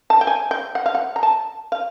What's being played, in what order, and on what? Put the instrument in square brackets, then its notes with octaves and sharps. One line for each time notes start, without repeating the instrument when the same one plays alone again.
[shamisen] A5
G5
G#5
G5
F#5
F5
F#5
A#5
A5
F5